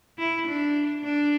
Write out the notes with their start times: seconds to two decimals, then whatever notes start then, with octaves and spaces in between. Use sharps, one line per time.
0.19 E4
0.47 D4
1.04 D4